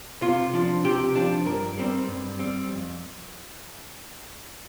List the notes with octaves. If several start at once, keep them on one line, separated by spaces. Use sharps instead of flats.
C3 F4
F3 D4
C3 G4
F3 D4
G2 A#4
G3 C4
G2
G3 C4
F2